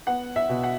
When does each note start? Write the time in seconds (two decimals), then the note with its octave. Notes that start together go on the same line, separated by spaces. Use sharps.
0.07 B3 F#5
0.36 E5
0.49 B2
0.63 F#5